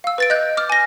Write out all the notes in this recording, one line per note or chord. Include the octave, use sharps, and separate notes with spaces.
F5 E6
B4 A6 D7
D#5 F#6 G6
D6 F6
G#5 A#6